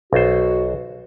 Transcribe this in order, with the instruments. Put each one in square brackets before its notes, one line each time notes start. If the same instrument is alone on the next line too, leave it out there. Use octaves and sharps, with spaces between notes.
[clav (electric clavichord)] B1 C5 [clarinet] F#4